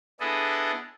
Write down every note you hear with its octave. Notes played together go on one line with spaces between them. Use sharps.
B3 D4 E4 G#4 A4 D#5